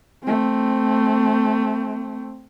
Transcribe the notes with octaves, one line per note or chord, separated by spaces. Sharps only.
A3 C4